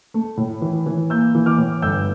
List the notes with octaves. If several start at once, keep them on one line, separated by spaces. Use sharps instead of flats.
A3
A2
E3
E3
A#3 E6 G6
E3
D6 F6
A2
G1 E6 G6